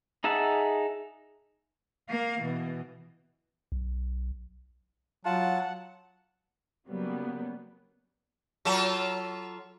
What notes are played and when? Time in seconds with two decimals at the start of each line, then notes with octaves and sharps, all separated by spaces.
0.24 D#4 G#4 E5 F#5 A5
2.09 A#3 F5
2.40 B2 E3
3.72 B1
5.25 F#3 F4 F#5 A5
6.88 C#3 F#3 G3 A#3 B3
8.65 F#3 F4 A4